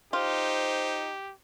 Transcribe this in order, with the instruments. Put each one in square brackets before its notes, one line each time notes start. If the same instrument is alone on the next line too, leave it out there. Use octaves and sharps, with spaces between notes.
[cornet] D#4 [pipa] F4 [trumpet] G4 [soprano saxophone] C5